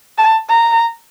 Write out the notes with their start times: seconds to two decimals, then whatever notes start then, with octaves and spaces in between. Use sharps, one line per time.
0.18 A5
0.49 A#5